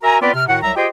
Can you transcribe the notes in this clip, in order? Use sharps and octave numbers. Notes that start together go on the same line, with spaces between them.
F#4 A#4 E5 G#5 A#5
B3 C4 F4 B4 D5
C3 F6
A2 D#3 F#4 F#5
C2 F#3 E5 A#5
F4 G4 G#4 C5 D#5 G5